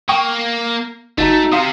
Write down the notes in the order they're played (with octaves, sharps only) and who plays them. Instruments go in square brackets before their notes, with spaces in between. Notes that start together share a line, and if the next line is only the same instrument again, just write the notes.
[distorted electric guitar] A#3 [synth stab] G5 C#6 D#6
[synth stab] G1 [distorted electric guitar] A3 [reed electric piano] D#4 F#4 A#5
[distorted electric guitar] C3 [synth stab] F5 C6 D#6